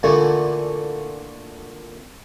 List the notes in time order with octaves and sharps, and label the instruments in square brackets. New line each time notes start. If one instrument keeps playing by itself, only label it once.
[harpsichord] A#2 D3 E3 A3